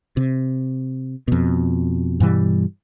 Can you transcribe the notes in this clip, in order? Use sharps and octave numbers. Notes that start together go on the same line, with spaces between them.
C3
F2 B2
G2 B2 E3 G3